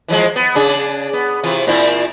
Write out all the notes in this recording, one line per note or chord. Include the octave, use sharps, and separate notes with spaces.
E3 F3 G#3
B3
C#3 D4 G#4
B3
C3 E3 F4
A#2 C4 E4